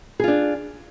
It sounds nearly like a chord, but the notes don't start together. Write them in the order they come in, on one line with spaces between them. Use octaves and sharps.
G#4 F4 D4